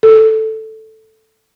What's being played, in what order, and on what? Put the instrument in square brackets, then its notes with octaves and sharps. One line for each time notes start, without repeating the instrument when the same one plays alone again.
[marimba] A4